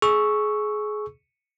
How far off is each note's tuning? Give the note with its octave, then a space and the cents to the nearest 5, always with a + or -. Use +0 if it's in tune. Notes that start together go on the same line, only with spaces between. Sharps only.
G#4 +25 C#6 +0 E6 +0